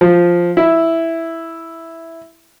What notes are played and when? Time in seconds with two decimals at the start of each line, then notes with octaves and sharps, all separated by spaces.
0.01 F3
0.57 E4